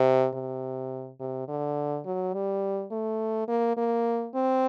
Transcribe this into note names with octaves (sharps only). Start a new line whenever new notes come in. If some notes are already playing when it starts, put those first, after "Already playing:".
Already playing: C3
C3
C3
D3
F#3
G3
A3
A#3
A#3
C4